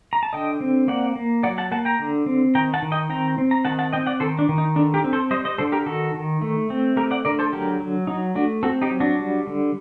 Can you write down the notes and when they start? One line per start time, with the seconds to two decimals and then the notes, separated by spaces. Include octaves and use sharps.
0.13 A#5
0.23 A5
0.33 D3 D#5 G5
0.61 C4
0.88 A#3 D5 F#5
1.16 A#3
1.43 F#3 D5 F#5
1.58 F#5 A5
1.71 A#3 F#5 A5
1.85 G5 A#5
1.99 D3
2.26 C4
2.55 D#3 G5 A#5
2.74 F#5 A5
2.82 D#3
2.92 D#5 G5
3.09 C4 G5 A#5
3.38 C4
3.51 A#5
3.65 D#3 F#5 A5
3.79 F#5 A5
3.93 C4 D#5 G5
4.07 D5 F#5
4.20 D#3 A4 C5
4.39 D4
4.49 D#3
4.58 D#4
4.76 D3 D4
4.94 G4 A#4
5.04 C4
5.13 A4 C5
5.31 G3 C5 D#5
5.45 C5 D#5
5.58 D3 A4 C5
5.72 G4 A#4
5.86 D#3 F#4 A4
6.14 D#3
6.41 A3
6.70 C4
6.96 A3 G4 A#4
7.11 D5 F#5
7.25 D3 A#4 D5
7.39 A4 C5
7.53 F#3 G4 A#4
7.80 F#3
8.07 F#3 D#4
8.35 A3 D4 F#4
8.63 C4 F#4 A4
8.82 D#4 G4
8.91 F#3
9.00 D4 F#4
9.19 G3
9.47 D3